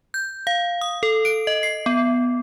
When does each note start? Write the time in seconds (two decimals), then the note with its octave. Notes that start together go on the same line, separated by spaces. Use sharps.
0.14 G6
0.47 F5
0.81 D#6
1.03 A4
1.25 D7
1.47 D#5
1.63 C7
1.86 B3